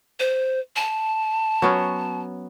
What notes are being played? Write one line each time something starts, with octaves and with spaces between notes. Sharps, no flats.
C5
A5
F#3 B3 C#4